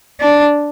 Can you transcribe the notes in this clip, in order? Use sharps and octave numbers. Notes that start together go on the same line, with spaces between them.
D4